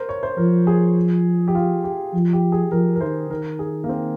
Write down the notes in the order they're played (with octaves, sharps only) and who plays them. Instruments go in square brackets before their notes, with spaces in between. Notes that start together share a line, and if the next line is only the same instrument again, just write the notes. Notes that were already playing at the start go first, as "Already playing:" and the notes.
Already playing: [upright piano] A#4 C5
C#5
C5
[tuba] F3 [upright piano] A#4
[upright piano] G#4
G4
F4
G4
[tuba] F3
[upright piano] G4
G#4
[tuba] F3 [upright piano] A#4
[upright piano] A#4
[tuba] D#3 [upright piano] C5
[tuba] D#3 [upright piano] A#4
[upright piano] G#4
A#3
C4